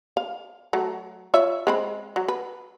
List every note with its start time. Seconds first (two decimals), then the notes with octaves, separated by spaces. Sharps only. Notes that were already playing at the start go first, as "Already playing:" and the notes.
0.17 F5
0.73 F#3 A3
1.34 F4 C#5 E5
1.67 G#3 C4 B5
2.16 F#3
2.28 B4